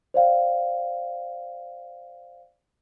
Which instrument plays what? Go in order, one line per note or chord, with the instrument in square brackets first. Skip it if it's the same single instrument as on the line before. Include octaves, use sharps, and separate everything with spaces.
[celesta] C5 D5 F5 G5